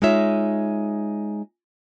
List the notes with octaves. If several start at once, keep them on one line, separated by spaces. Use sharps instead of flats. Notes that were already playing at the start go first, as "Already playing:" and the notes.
G#3 D#4 F4 C#5 E5